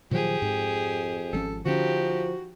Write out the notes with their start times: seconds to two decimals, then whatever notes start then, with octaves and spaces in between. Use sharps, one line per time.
0.11 A#2 D#3 F3 F#3 G4 G#4
0.42 F2 G#2
1.33 G#1 F3 C#4 A4
1.65 D3 F3 C#4 D#4 F#4 G4